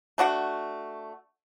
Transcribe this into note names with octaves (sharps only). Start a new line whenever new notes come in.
A3 D4 F#4 F#5